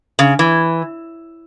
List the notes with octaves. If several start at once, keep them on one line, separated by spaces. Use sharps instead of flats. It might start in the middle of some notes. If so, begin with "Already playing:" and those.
C#3
E3